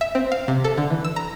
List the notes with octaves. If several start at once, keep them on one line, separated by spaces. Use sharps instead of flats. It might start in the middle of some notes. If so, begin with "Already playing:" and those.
E5
C4
F5
C3
A4
D3
E3
E6
A#5